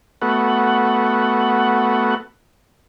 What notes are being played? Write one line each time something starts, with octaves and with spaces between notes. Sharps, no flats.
A3 B3 F#4